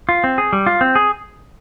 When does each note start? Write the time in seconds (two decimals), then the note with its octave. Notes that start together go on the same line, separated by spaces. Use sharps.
0.09 F4
0.24 C4
0.38 G#4
0.53 G3
0.67 F4
0.81 C4
0.95 G#4